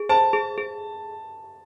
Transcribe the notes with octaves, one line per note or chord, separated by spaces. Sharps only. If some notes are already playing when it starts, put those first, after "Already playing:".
Already playing: G#4
C5 A5
G#4
G#4